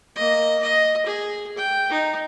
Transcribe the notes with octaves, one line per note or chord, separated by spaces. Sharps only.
A#3 D#5
D#5
G#4
G5
D#4